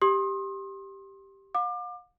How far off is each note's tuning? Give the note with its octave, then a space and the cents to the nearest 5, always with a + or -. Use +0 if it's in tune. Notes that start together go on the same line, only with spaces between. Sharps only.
G4 +0 C6 +30 D#6 +0
F5 +45 D6 +30